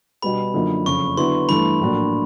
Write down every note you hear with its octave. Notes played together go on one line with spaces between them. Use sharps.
B2 G3 B3 B5
F#2 D3 F3 A#3 D#4
F#1 F2 C#3 C#6
D3 F#3 B3 E4 C6
G2 E3 A3 B5
A#1 A2 F#3 A#3 D4